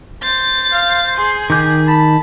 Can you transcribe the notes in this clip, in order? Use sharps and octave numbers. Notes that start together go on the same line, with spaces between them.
C5 A6
F5
G#4 C6
D#3 G4 G6
A5 B5